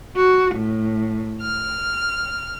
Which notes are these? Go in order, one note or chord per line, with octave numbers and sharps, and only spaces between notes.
F#4
A2
F6